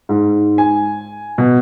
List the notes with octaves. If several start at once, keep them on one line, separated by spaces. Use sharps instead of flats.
G#2
G#5
B2